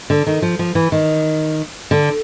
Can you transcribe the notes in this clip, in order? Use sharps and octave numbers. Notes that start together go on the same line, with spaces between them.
D3
D#3
F3
F3
E3
D#3
D3